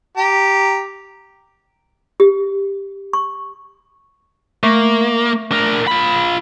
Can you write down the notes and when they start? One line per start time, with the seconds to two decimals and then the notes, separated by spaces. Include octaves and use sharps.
0.17 G4 A#5
2.20 G4
3.13 C#6
4.63 A3 A#3
5.52 D4 A#4
5.87 F4 B5